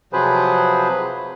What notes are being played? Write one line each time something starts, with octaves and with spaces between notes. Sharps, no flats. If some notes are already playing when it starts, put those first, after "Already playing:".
C3 F3 F#3 G#4 B4 C5